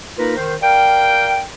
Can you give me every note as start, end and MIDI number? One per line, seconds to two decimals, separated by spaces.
0.17 0.34 58
0.17 0.34 63
0.17 0.34 65
0.17 0.34 70
0.17 0.34 71
0.36 0.55 51
0.36 0.55 72
0.62 1.42 70
0.62 1.42 74
0.62 1.42 77
0.62 1.42 79